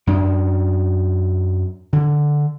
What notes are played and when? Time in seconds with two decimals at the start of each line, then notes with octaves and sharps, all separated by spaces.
0.07 F#2 D4
1.93 D3